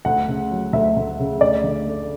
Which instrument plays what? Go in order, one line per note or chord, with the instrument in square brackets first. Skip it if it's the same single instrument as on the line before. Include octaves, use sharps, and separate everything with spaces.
[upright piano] D2 F#5
C#3
F#3
D2 E5
D2
C#3
D2 D5
D3
A3